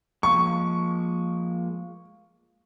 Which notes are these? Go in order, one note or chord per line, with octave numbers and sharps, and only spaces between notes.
F3 G#3 A#3 C#6